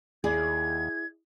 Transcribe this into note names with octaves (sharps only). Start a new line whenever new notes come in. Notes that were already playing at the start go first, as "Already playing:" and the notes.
D#2 E4 G#4 D5 G#6